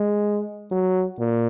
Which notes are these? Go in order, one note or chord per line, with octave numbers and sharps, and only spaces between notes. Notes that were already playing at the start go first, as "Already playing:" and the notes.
Already playing: G#3
F#3
A#2